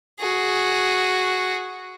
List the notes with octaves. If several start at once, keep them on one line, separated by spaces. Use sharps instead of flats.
F#4 G#4